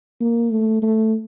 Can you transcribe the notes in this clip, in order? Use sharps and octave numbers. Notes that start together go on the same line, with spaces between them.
A#3
A3
A3